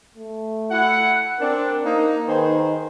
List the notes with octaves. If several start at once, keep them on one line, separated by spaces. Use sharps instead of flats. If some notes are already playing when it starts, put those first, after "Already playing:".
A3
E4 F#5
C4 D4 A#4
A#3 D#4
D#3 G#4 B4 C5